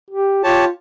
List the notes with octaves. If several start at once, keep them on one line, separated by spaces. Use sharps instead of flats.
G4
F4 G4 C#5 A5